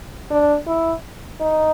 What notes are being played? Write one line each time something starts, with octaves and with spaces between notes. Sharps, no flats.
D4
E4
D#4